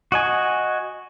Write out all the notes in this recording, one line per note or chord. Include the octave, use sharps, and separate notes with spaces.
F#4 D#5 G#5